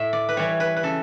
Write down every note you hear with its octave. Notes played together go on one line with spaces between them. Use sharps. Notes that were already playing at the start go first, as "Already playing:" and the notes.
Already playing: A2 E5
D5
B4
E3 G3 C#5
B4
B4
C#3 A4